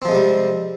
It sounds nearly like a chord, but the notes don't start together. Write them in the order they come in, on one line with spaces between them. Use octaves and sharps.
C4 F3 G#3 C3 G3